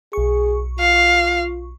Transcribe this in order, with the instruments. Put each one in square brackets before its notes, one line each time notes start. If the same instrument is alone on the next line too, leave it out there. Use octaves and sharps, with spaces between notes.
[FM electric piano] B1 C#6 [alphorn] G#4
[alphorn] F4 [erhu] F5